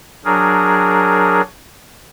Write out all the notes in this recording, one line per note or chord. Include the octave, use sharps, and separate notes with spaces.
F#3 D4 G#4 A#4